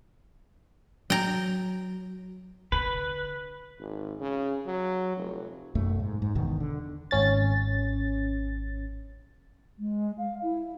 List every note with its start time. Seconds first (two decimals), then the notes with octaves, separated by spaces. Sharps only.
1.10 F#3 G5 A#5
2.72 D3 B4
3.80 G#1
4.20 C#3
4.66 F#3
5.17 F1
5.75 B1 F#2 A3
6.00 G#2
6.22 G#2
6.35 G1 E2 B2 D#3
6.60 D3
7.11 G#1 C#4 A6
9.79 G#3
10.18 F5
10.42 E4